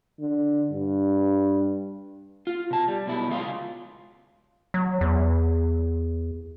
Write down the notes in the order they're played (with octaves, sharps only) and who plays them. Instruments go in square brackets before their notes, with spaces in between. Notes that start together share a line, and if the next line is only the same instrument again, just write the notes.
[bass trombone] D3
G2
[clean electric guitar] F4
B2 A5
G3
B1 B2 E4
C#2 G#3 F4 F#4 F5 C6
[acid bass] F#3
E2